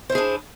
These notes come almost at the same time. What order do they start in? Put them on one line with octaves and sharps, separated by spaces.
C5 E4 G#4 D4